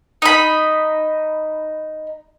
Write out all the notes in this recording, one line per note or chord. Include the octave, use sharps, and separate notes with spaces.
D#4 B5